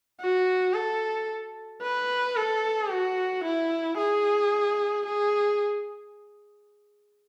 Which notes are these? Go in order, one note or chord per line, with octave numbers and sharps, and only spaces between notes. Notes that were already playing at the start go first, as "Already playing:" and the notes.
F#4
A4
B4
A4
F#4
E4
G#4
G#4